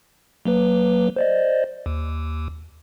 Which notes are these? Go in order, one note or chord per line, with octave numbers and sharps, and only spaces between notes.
F#3 A#3 B4
C5 D5 D#5
D#2